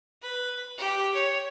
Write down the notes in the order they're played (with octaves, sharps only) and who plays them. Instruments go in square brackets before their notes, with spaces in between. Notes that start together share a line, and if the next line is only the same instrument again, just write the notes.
[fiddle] B4
G4
C#5